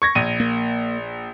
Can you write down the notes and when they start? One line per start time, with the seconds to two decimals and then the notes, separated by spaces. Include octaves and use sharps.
0.02 C#6 G#6 A#6
0.15 A#1 D#7
0.40 A#3